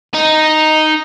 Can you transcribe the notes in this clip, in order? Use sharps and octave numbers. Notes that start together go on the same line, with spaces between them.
D#4